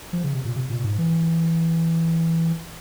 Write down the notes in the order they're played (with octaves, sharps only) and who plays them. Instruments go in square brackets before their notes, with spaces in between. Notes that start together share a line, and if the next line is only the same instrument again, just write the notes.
[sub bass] F3
C#3
C3
A#2
C3
A#2
G#2
E3